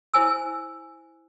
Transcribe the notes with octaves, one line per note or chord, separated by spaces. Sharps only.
E4 C5 G#5 E6